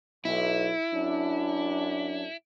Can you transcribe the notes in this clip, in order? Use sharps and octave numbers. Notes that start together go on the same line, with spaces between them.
B1 E4
F#2 D4